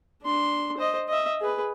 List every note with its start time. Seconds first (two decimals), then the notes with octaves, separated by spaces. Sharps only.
0.23 D4 C6
0.77 C5 D#5
1.08 D#5 E5
1.40 G#4 B4